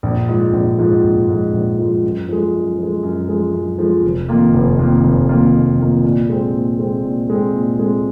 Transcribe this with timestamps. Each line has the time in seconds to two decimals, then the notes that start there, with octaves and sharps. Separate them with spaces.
0.03 A#1
0.28 G#2 F3
0.53 A#1
0.79 G#2 F3
1.03 A#1
1.28 G#2 F3
1.53 A#1
1.78 G#2 F3
2.03 F#2
2.28 F3 G#3
2.54 F#2
2.78 F3 G#3
3.03 F#2
3.28 F3 G#3
3.54 F#2
3.78 F3 G#3
4.03 F1
4.29 F2 D#3 A#3 F4
4.54 F1
4.79 F2 D#3 A#3 F4
5.04 F1
5.29 F2 D#3 A#3 F4
5.54 F1
5.79 F2 D#3 A#3 F4
6.04 A#2
6.29 G#3 C4
6.55 A#2
6.79 G#3 C4
7.04 A#2
7.29 G#3 C4
7.55 A#2
7.79 G#3 C4